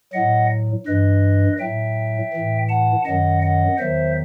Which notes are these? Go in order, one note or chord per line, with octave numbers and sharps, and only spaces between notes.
A2 F#3 D#5 F#5
G2 E3 B4 D#5
A2 F#3 E5 G5
A2 E3
F#5 A5
F#2 D#3 F#3 D#5 F#5
D#5 F#5
E2 D#3 F#3 C5 E5